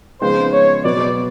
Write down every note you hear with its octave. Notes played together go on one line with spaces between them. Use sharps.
C#3 F3 G#3 B3 D#4 C5
C#5
B2 F#3 B3 D5